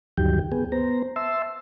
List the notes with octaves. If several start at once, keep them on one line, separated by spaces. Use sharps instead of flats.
D2 G2 D#3 F#3 G4 G5
B3 G#4
B3 C5 A#5
E5 A5 C6 E6